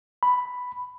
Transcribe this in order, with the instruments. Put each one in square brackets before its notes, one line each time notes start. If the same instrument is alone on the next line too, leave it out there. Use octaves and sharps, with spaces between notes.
[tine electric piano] B5